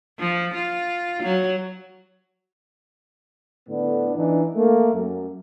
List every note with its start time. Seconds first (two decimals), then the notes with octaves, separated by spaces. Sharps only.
0.18 F3
0.54 F4
1.23 F#3
3.69 A2 D3 B3 D4
4.16 E3 D4 D#4
4.55 A3 A#3
4.93 F#2